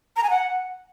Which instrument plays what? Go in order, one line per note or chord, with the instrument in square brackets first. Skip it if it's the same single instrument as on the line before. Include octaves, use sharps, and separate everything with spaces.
[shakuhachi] A#5
G#5
F#5